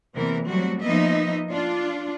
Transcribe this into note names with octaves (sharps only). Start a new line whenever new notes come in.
E2 C3 E3 A#3 C4 A#4
F#3 G3 A3 C4 F#4
F3 A#3 B3 D#4 D#5 E5
D4 F4